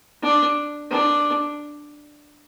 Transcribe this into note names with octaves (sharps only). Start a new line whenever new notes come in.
D4
D4